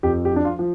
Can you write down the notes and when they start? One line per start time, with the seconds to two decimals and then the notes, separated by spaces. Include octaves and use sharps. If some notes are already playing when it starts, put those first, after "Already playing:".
0.03 F2 G4
0.25 G4
0.32 F3 D4
0.45 F4
0.59 F3